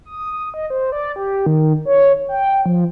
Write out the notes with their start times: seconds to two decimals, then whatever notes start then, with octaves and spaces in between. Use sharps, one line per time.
0.05 D#6
0.54 D#5
0.70 C5
0.92 D5
1.16 G4
1.47 D#3
1.85 C#5
2.29 G5
2.66 F3